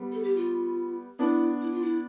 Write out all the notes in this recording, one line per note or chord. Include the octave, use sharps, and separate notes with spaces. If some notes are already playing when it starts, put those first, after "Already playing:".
Already playing: G3 B3
A4
G4
F4
B3 D4 E4
E4
F4
E4